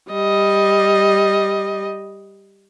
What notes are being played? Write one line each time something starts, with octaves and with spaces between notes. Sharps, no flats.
G3 D#5